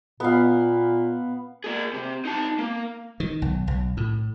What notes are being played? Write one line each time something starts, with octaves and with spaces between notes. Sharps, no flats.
A#2 B3 F5
A#3 G#4
C3
D#4 A5
A#3
D#3
B1
B1
A2